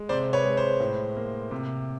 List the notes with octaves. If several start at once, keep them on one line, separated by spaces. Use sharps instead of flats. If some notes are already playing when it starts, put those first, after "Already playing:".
Already playing: G#3
C3 C5 D5
B4 C#5
G#3
C5
A2
A#3
C3